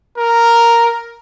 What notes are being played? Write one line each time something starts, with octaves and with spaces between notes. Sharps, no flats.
A#4